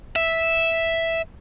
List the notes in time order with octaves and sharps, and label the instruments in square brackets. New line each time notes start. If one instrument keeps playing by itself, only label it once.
[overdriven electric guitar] E5